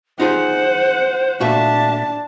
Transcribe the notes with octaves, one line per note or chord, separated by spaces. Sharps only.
D#4 F4 G#4 C5 F#5
A#2 A3 D4 F#4 E5 A5